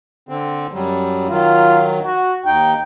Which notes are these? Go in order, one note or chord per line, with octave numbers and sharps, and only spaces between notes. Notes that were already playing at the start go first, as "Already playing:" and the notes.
D3 C4
F#2 F#3 G3
D#3 F#3 F4
F#4
D#2 D#4 G5